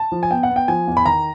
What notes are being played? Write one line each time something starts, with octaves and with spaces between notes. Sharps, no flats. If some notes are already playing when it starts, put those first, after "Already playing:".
Already playing: A5
F3
G#5
B3 G5
F#5
B3
G5
F3 G#5
E2
B5
D#3 A#5